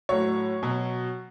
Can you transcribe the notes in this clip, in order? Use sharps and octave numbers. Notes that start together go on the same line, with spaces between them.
A2 F#3 C#5
B2 F#3